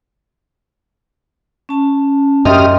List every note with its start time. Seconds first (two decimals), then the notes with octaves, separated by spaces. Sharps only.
1.69 C#4 A5
2.45 F#2 G4 D#5 E5 C6 D#6 F6